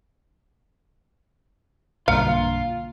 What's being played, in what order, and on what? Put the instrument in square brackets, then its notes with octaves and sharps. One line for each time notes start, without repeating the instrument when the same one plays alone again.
[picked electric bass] B1 G2 D3 [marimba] A#3 A#5 F6 [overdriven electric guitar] F4 [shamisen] F5